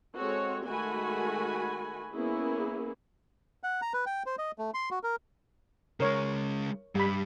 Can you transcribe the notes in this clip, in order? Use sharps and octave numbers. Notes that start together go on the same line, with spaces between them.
G#3 C4 F#4 A4 C#5
D#3 G#3 A3 F#4 G#5 B5
A#3 B3 C#4 E4 G#4
F#5
A#5
B4
G5
C5
D#5
A3
C6
F#4
A#4
C#3 G#3 A#4 C#5
G2 G3 B5